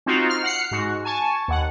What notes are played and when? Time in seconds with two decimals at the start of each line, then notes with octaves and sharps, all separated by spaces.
0.06 C4 D#4 F4 F#4
0.29 F6
0.43 F#5 F6 C7 C#7
0.71 G#2 F#4
1.04 G#5 A5 C#6
1.48 D#2 F#5